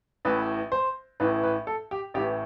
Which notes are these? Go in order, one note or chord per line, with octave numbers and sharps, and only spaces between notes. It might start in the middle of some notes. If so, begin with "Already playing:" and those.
A1 A2 E3 B4
C5
A1 A2 E3 B4
B4
A4
G4
A1 A2 E3 G4